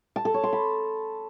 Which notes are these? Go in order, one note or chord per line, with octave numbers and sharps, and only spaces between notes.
A5
A4
C#5
C6
B5